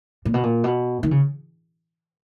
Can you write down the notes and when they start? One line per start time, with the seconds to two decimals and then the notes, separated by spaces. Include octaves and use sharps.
0.25 A#2
0.34 B2
0.43 A#2
0.64 B2
1.03 D#3
1.11 C#3